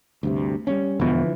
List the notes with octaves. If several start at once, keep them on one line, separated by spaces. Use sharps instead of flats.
D2 G2 C3
G3 B3 C#4
E1 B2 D3 E3 F3